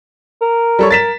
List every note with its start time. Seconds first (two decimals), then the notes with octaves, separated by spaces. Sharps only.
0.42 A#4
0.79 G3 A4 C#5
0.91 A#4 A6 B6 E7